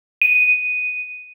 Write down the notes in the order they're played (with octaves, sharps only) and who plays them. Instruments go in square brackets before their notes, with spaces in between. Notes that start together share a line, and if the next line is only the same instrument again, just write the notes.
[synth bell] D#7